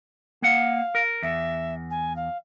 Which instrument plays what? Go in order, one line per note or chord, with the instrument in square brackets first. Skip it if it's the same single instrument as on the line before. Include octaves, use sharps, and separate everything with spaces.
[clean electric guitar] A#3 F#5 [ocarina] F5
[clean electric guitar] A#4
[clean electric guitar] E2 [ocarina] E5
[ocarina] G#5
F5